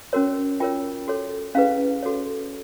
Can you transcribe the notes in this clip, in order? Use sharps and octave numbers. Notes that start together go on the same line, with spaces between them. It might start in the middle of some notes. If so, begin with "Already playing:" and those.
C#4 F#4 A#4 C#5
F4 A#4 C#5 G5
F#4 A4 C#5
C#4 E4 G#4 B4 F5
F#4 A4 C#5